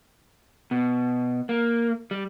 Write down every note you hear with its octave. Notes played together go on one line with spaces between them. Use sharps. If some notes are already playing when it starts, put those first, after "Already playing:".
B2
A#3
G3